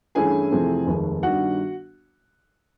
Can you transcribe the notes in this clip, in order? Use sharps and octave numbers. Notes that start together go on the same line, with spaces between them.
G2 E3 A3 C#4 E4 G#4 G#5
F2 C3 E3 A3 C4
F1 D#2 D#3 G#3
G1 G2 D#3 G3 F#4 F#5